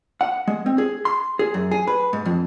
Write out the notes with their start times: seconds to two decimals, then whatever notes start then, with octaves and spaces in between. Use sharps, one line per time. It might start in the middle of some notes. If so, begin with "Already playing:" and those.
0.21 F#5
0.48 G#3
0.66 C4
0.78 G#4
1.05 C6
1.39 G#4
1.54 F#2
1.71 G#4
1.87 B4
2.13 G#2
2.25 F2